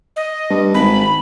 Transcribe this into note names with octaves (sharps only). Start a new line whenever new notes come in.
D#5
G2
G#1 B5